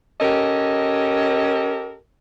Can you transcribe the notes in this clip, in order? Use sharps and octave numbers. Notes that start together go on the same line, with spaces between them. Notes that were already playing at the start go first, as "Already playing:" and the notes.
C#4 G4 A4 A#4 D#5